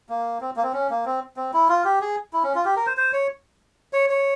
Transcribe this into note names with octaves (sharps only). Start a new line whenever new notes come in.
A#3
C4
A#3
C4
C#4
A#3
C4
C4
E4
F4
G4
G#4
E4
C#4
F4
G4
A#4
C5
C5
C#5
C#5
C#5